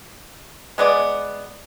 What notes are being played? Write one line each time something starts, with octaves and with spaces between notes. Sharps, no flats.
G#3 B3 D5